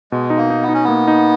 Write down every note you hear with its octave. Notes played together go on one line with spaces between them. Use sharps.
B2 G#3
D#4
A#3
D#4
B3
D#4
C#4
A#3 B3
D#4